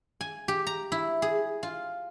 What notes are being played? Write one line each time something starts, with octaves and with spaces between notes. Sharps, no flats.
G#5
G4
A#5
E4
G#4
F4